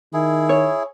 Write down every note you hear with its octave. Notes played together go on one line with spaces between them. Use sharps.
D#3 E4 G#4
C#5